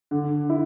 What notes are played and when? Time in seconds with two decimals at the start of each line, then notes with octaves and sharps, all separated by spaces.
0.11 D3
0.50 E4